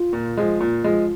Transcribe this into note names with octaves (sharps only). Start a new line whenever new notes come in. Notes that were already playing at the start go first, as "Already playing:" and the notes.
Already playing: F4
A#2
F3 G#3
A#2
F3 G#3